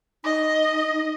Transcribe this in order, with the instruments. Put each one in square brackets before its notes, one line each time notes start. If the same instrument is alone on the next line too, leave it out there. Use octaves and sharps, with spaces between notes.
[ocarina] D#4 [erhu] D#5